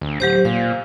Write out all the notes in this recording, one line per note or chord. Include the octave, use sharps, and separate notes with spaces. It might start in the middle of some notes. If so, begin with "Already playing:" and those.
D2
D1 F#3 G4 C5
A#2 F5